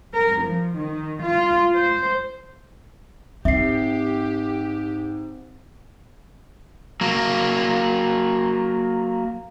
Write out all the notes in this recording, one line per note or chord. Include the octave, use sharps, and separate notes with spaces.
A#4
F3
D#3
F4
C5
G#2 C4 G4 E5 C7
F#3 A#3